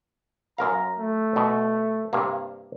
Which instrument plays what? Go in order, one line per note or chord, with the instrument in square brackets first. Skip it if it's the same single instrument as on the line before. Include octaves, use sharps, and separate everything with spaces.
[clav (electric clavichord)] F#2 A#4 F5 [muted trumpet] A#5
[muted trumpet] A3
[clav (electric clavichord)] B2
G2 C3 A#3